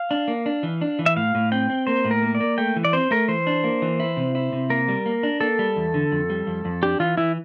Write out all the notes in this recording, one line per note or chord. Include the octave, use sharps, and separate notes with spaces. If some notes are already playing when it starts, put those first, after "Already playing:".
Already playing: F5
D4
A#3
D4
E3
D4
E3
E5
A2 F5
A2
C4 G5
C4
A#3 C5
A2
A#4
A#3
D5
A#3
A3 G5
E3
D5
C4 C5
A3 A#4
E3 C5
D4
A#3
E3
E4
C3
E4
C3
A#3 A#4
G3
A#3
D4
A#3 A4
G3
E2
D3
F2
G3
F2
F2
D4 G4
E3 F4
E3 E4